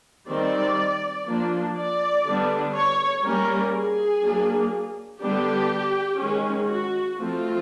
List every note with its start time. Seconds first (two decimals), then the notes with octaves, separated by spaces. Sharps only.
0.28 D#3 G3 C4 D5
1.27 F3 A#3 D4
1.77 D5
2.25 D3 G3 B3 D4
2.74 C#5
3.24 G3 A#3 C#4 A#4
3.74 G#4
4.22 F#3 A#3 D4
5.21 D3 G3 B3 D4 G4
6.20 D#3 G#3 C#4
6.69 F#4
7.18 F3 A3 C4 F4